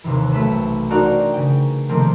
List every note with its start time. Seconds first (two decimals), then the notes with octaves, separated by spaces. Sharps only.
0.04 D#2 C3 E3
0.32 B1 A3 B5 E7
0.90 D4 D#4 F#4 A#4 C5 D5
1.05 G5
1.34 C#3 G5
1.89 C3 D#3 F3 A3 A#3 C4